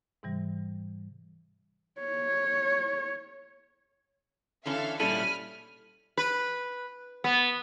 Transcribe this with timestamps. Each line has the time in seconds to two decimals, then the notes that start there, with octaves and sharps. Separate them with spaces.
0.23 G#2 C3 E3 G3
2.01 C#5
4.66 D3 E3 C#4 A4 E5 F5
5.00 A#2 G3 C#4 E4 A4 B5 F6 D#7
6.17 B4
7.24 B3